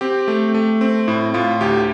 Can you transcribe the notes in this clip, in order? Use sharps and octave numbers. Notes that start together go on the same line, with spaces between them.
C4 G4
A3
A3
C4
A2 E4
A2 F4
D2 G4